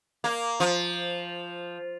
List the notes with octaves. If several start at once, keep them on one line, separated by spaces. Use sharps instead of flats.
A#3
F3